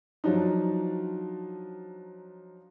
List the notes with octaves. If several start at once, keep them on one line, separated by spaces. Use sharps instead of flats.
F3 F#3 D4 D#4